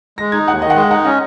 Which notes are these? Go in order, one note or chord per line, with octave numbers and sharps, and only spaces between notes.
G#3 A#6
D#4 G#6
D#2 F#5
D#3 D#5
F#5
G#3 D#5
D#4 F#5
C#4 D#5